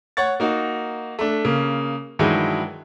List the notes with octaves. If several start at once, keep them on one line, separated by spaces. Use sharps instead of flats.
C#5 F#5 C#6 A6
A#3 D#4 F#4
A3 D4
C#3 A#3
G2 D#3 E3 F#3 G#3